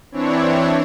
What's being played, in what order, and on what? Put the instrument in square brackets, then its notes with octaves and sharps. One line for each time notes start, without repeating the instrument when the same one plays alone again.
[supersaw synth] E3 C4 D4 E4 C#5